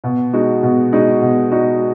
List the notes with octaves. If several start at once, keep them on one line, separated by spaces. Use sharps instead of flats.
B2
G#3 D#4 F#4
B2
G#3 D#4 F#4
B2
G#3 D#4 F#4